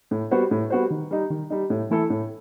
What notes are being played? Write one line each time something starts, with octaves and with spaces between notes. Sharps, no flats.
A2
G3 B3 F#4 C5
A2
G3 B3 F#4 C5
D#3
G3 D#4
D#3
G3 D#4
A2
E3 A3 E4 A4
A2